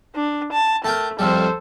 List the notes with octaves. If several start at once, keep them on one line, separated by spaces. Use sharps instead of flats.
D4
A5
A3 A#4 G5 A5
C2 F2 G3 A4 C5